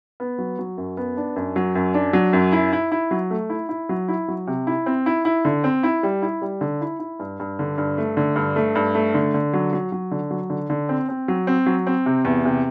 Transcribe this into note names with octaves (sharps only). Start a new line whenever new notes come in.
B3
F#3
F#3
F#2
B3
D4
F#2
F#3
F#2
D4
F#3
F#2
E4
E4
E4
F#3
A3
E4
E4
F#3
E4
F#3
C3
E4
C4
E4
E4
D3
C4
E4
G3
E4
G3
D3
E4
E4
G2
G2
D3
G2
A3
D3
G2
A3
G2
A3
D3
D3
F#3
F#3
F#3
D3
F#3
D3
D3
C4
C4
F#3
C4
F#3
C4
C3
E2
C3